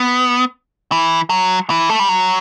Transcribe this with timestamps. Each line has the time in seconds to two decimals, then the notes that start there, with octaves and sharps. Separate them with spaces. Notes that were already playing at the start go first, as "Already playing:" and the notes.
Already playing: B3
0.92 E3
1.30 F#3
1.70 E3
1.89 A3
1.99 G3
2.09 F#3